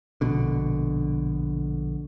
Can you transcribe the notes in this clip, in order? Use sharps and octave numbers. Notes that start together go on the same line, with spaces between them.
A#1 B2 D3